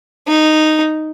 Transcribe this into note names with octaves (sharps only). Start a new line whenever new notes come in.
D#4